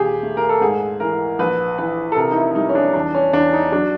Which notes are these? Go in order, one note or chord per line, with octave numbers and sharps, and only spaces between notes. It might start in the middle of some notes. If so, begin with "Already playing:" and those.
Already playing: D#2 A#2 G4 G#4
A3
A#4
A4
G#2 G#4
E3 A#4
A#1 B4
E3 B4
A4
C3 A#4
D#4
E4
G3 D#4
C#4
D4
E2 D4
C#4
E2 D4
D#4
F#3 D4